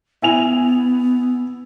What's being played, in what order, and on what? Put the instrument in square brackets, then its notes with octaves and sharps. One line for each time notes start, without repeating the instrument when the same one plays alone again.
[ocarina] B3 [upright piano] E4 G#5 F7